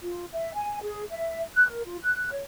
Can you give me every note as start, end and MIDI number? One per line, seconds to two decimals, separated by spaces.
0.03 0.24 65
0.32 0.52 76
0.54 0.79 80
0.82 1.04 68
1.11 1.41 76
1.55 1.66 90
1.68 1.82 70
1.86 1.97 65
2.02 2.29 90
2.32 2.41 73